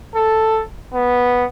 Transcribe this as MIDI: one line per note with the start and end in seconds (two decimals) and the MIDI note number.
0.16 0.63 69
0.94 1.45 59